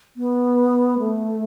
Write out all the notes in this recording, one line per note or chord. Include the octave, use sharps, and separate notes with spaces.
B3
A3